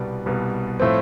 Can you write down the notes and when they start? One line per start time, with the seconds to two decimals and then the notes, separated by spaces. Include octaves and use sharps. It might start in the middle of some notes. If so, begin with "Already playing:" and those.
Already playing: C2 B2 G3 B3 D5
0.26 C2 B2 G3 B3
0.80 A2 F3 A3 C4